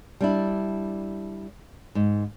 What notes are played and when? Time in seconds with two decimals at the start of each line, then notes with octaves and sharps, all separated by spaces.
0.21 G3 D4 E4
1.95 G#2